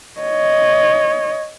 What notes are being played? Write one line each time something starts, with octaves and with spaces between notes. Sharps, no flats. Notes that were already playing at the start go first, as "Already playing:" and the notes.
C#5 D#5